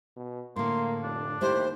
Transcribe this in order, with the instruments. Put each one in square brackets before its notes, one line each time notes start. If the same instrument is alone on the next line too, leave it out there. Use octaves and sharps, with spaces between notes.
[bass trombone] B2
[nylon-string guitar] A2 D3 [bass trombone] A#3 [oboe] C6
[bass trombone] F1 [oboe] D4
[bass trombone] D#2 [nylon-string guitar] A3 E4 G4 [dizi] C5